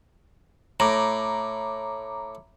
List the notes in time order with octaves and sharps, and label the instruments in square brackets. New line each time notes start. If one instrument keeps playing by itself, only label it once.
[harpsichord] A2 [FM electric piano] A#5 D6